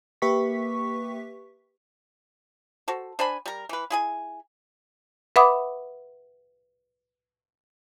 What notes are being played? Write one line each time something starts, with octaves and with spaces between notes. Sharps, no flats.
A#3 G4 B4 E5 C#6 B6
F#4 A4 C5
D4 C5 G#5 B5
G3 A#4
E3 B4
E4 G#4 G#5
B4 E5 F#5 B5 D6 D#6